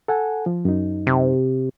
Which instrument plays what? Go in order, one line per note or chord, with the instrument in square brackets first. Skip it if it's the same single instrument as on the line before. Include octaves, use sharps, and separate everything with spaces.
[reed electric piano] A4 F#5 G#5
F3
F#2 D#4
[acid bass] C3